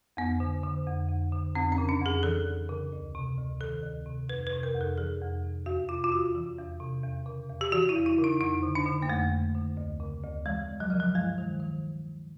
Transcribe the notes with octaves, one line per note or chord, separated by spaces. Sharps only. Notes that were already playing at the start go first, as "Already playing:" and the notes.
F2 B3
D3
D3
F2
F2
D3
F2 C4
C#4
C#3
D4
F2 G#4
E3 A4
F2
C#3
D2
C3
D2
D#3 A4
D2
C3
F2 B4
B4
C3
A#4
F2
A4
E3 G#4
F2
C3
E2 F#4
C3 F4
F4
E2 F#4
E3
E2
C3
E2
C#3
E2
G4
E3 F#4
E4
E2
E4
C#3
D#4
F2 D#4
D3
D4
D3
A#3
F2 A3
F2
D3
D2
C#3
D2
E3 G#3
D2
F#3
C#3 F3
F#3
G2 G#3
D#3
D#3